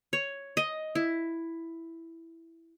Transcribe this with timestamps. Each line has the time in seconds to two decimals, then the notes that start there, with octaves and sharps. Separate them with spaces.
0.13 C#5
0.57 D#5
0.95 E4